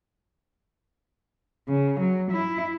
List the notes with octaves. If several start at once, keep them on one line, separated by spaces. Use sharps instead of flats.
C#3
F#3
E4